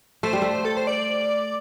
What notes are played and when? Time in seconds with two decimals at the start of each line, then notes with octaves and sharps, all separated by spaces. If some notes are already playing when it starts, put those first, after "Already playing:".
0.23 A3 C5
0.33 G3
0.42 A3
0.65 A4
0.77 C5
0.87 D5